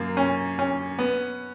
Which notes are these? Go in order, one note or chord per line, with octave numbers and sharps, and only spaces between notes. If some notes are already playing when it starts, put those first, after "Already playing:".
Already playing: F#2 A#3
C#4
C#4
B3